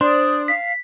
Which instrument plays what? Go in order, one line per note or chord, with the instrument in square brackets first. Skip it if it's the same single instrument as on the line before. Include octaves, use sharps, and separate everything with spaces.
[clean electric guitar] D4 [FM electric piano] C5 [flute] D5 [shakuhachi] D#6
[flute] F5 [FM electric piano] B6